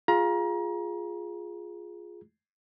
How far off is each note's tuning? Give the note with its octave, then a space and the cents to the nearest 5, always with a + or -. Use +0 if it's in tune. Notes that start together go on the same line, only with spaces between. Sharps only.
F4 +5 G#4 +0 A#5 +30